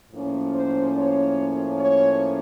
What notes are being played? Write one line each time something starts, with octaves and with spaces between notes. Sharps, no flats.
A2 F3 A#3 C#4
C5
C#5
C#5